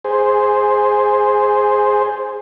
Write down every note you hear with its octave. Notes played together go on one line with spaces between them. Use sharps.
G#4 C5